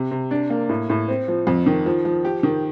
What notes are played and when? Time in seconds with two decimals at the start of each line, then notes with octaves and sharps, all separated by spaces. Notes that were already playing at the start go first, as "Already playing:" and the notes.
Already playing: C3
0.11 C3
0.31 D4
0.50 A#3
0.69 A2
0.90 A2
1.08 C4
1.28 F3
1.47 F2
1.66 D#3
1.86 F3
2.05 F3
2.25 G4
2.43 D#3